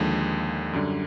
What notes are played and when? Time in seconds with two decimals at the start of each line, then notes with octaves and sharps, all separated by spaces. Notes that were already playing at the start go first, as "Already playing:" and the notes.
Already playing: D#2 D3 F3 G#3
0.73 F#2 D3 G3